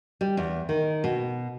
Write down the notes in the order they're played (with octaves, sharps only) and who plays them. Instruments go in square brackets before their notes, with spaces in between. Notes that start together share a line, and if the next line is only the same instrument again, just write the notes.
[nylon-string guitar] G3
E2
D#3
B2